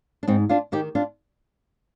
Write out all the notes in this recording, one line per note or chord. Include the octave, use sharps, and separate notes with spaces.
D4
G#2 C4 D#4
D4 F4
D#3 D#4 G4
D4 F4